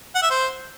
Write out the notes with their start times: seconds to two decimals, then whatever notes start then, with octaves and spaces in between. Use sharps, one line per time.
0.15 F#5
0.23 E5
0.30 C5